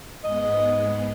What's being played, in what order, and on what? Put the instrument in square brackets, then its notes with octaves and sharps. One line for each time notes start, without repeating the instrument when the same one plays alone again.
[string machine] G#2 G#3 B3 [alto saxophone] D#5